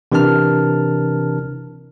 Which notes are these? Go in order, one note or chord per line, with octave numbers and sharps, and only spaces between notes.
C3 E3 D4 A#4 A5 F6